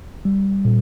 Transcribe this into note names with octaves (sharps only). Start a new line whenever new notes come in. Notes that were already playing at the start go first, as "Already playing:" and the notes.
G3
A#2